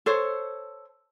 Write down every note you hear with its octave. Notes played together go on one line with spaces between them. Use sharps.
A4 C5 C#5